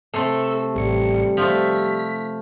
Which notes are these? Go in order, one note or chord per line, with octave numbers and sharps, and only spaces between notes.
C3 A3 A4
A1 G3 C#7
F3 A3 B6